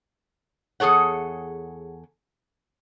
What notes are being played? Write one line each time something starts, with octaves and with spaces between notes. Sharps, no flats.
E2 G#4 A4 C#5 F#5